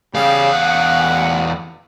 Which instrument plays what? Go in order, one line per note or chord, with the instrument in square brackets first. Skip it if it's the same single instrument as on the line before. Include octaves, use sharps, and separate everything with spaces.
[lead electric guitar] E2 F5 [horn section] C#3 G3
[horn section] F#5